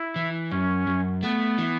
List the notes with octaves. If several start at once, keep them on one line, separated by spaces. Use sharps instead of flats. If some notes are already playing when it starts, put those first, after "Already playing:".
Already playing: E4
E3
F#2 C#4
F#2
A3 B3
E3